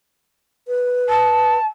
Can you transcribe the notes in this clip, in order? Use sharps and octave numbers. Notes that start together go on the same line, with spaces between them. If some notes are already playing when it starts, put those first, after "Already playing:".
B4
A5